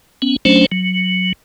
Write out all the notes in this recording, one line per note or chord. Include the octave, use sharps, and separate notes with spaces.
B3 C#4
F#3 A3 C#4 D4 C5
F#3